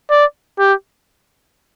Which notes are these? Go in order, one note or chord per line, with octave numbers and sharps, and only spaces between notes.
D5
G4